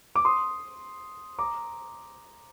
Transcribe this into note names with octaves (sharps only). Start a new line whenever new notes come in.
D6
C6 D#6
A#5 D6